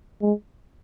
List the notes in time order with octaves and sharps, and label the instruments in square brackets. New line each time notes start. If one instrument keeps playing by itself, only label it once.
[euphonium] G#3